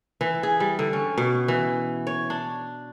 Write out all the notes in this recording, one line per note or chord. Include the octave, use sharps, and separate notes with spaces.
E3
G#4
G3
D3
C#4
B2
E3
C#5
D4